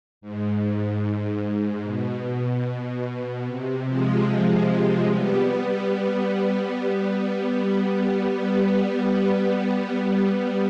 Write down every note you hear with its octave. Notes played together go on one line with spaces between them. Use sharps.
G#2
B2
C3
F3 G#3
G3 B3
G3 B3
G3 B3
G3 B3